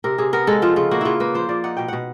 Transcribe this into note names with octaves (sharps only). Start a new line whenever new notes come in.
C3 A#4
C3 G#4
B3 A#4
G#3 A4
F3 F4
C#3 F4
A#3 F#4
C#3 E4 F4
A#3 B4
F3 C5
F3 D5
D#4 F#5
B2 G5
B2 F#5